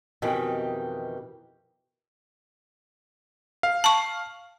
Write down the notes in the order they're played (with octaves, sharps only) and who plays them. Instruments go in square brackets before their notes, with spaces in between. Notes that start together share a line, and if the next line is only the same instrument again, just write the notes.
[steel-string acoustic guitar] F2 B2 D#3 E3 G4
[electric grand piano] F5
[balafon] A5 C#6